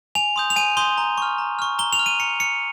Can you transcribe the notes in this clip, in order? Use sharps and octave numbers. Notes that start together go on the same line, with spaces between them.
G#5 F7
C6 D#6 G6
F7
G#5 D#7
C6 D#6 G6 G7
A#5
C#6 F6
A#5
C#6 F6
A#5 G7
F7
F6
D#7
A#5 C#7
F6 C#7